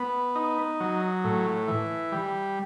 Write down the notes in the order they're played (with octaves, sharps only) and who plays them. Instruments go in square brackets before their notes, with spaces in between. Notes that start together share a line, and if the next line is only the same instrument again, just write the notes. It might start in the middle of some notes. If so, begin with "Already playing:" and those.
Already playing: [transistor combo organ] B3
D#4
F#3
A2
E3
G3